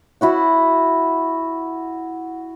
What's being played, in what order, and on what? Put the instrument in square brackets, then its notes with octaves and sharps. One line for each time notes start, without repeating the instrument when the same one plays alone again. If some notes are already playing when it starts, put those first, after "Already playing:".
[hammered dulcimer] E4 F#4 F#5